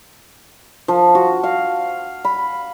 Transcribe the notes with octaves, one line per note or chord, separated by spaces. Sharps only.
F3
F#4
F5
B5